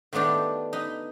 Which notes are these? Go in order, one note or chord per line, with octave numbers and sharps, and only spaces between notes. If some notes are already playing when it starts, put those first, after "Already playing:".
D#3 A3 B3 D4 G4
D#4 B4